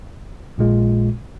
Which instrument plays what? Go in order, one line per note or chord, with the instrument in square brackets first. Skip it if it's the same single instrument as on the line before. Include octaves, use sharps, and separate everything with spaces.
[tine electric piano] A#1 A#2 G#3 F4